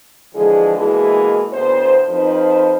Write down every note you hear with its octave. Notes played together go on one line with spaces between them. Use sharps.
D3 E3 F3 G#3 G#4
B2 E3 G#3 A#3 G#4
D2 A2 B3 C5
F2 F3 D#4 B4 C5